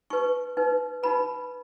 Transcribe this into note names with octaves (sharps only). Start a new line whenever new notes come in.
D#4 B4 C#6
D#4 B4
D#4 B4 B5